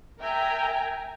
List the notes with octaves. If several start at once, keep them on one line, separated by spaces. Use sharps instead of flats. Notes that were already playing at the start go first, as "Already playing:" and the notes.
A#4 E5 G5 G#5 A#5